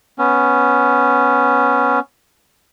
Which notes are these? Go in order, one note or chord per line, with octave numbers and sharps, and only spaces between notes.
B3 C#4